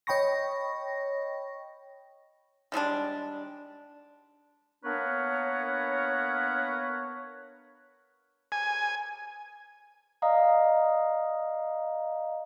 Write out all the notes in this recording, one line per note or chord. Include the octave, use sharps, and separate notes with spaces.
C#5 D#5 G5 B5 C#6 A#6
D#3 G3 G#3 D4
A#3 B3 D4 A#4 B4 C#5
G#5
D5 D#5 F5 A#5 D#6